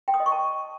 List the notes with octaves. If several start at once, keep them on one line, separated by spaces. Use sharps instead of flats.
G5
D#6
D#5
C#6
A5